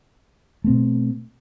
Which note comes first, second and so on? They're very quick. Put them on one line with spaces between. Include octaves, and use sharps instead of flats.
A3 C4 B2